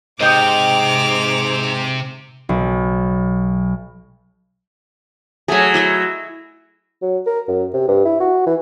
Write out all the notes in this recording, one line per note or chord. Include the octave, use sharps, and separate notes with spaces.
G#2 C3 D#5 G5 D6 D#6 F7
B1
F#3 A3 G#4 G#5
E4 D#5 E5
F#3
A#4
F#2
C3
G2
E4
F#4
E3